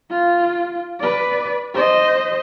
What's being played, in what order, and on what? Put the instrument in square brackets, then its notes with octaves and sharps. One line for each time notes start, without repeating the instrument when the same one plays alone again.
[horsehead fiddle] F4
B4 D5
C5 D#5